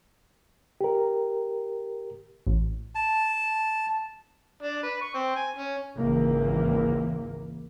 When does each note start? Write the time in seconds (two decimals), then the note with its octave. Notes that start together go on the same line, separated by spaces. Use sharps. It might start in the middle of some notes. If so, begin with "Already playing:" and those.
0.81 G4 A#4
2.47 A1
2.95 A5
4.63 D4
4.83 B4
5.01 C#6
5.15 C4
5.36 G#5
5.56 C#4
5.97 G#1 C#2 E3 A#3